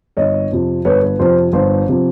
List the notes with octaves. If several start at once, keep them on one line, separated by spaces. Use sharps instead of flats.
G1 C#5 D#5
F2 C3 F3
G1 B4 C#5
B4
F2 C3 F3 C5
G1 C5
C3 F3